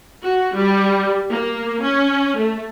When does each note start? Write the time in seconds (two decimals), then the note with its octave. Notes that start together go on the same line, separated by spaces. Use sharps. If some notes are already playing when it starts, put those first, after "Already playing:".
0.23 F#4
0.56 G3
1.30 A#3
1.82 C#4
2.37 A3